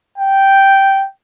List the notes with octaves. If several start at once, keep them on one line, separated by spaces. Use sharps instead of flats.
G5